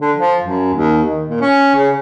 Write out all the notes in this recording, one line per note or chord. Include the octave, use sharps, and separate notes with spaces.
D3
F3
F#2
D#2
D#3
A#2
C#4
C#3